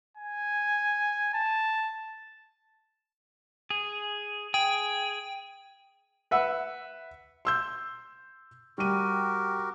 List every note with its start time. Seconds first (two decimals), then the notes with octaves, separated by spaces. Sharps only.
0.17 G#5
1.34 A5
3.70 G#4
4.54 G#4 G5
6.31 B4 E5 F#5
7.45 C6 E6 G6
8.78 G3 F#4 G4 A#4 D#7